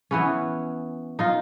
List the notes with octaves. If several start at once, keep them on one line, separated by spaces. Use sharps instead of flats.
E3 B3 C#4
D#4 F4